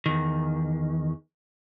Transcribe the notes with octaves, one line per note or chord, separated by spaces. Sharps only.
E2 D#3